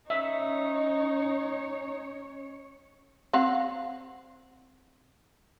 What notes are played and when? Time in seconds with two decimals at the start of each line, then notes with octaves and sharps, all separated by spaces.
0.10 C#4 D#4 C#5 E5
3.33 C4 F5 F#5